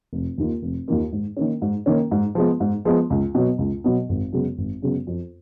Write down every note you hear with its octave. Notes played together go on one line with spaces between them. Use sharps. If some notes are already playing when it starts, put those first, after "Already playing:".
F1
D#2 D#3 A#3 F4
F1
D#2 D#3 A#3 F4
G#2
D#3 A#3 C#4
G#2
D#3 A#3 C#4
G#2
F3 G#3 B3
G#2
F3 G#3 B3
C#2
B2 F#3 B3
C#2
B2 F#3 B3
G#1
F#2 C#3 G#3 B3
G#1
F#2 C#3 G#3 B3
F2